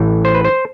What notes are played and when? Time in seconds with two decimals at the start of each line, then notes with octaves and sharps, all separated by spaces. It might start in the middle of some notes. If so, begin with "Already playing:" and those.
Already playing: A1 A2 E3
0.25 C5
0.35 B4
0.44 C5